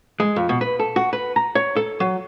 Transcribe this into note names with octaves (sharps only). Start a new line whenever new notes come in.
G#3
F2
B2
B4
A4
F#4
B4
A#5
C#5
A4
F#3